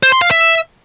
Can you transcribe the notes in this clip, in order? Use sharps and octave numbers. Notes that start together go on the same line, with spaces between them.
C5
C6
F5
E5